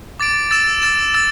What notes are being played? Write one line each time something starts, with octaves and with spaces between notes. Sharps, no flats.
D6 A6 D7
E6 A6 E7
E6 A6 E7
E6 A6 E7